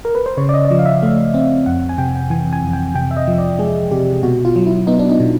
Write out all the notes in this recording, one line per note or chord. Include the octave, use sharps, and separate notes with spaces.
A#4
B4
C5
C#3 C#5
D5
D#5
D5
F3 D#5
F5
E5
A3 F5
C4
F2 F#5
G#5
C3 G5
E3 G#5
G#5
F2
G5
C3 G5
E5
D#5
F3
D5
G#3 G#4
C3 G4
B2 F#4
F4
F#3
E4
B3 D#4
D4
D#4
B2